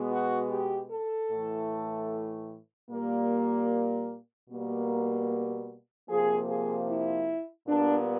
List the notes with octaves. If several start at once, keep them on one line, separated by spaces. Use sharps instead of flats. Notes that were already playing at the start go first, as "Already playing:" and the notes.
Already playing: B2 G#3 B3
F#4
G4
A4
A2 E3 A3
A#2 G3 A#3
B2 G3 A#3
C3 F3 A#3 G#4
G#4
E4
A#2 G3 B3 D4